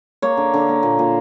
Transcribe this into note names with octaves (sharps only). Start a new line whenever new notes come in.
A#3 C#5
D3
D3
A#3
A#2
A#2